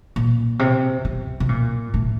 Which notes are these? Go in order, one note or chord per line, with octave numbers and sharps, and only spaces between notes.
A#2
C3
C3
C3
A#2
A2